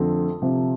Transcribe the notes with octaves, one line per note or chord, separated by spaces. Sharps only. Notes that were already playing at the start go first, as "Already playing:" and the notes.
Already playing: F2 D3 A3 C4
C3 F3 C4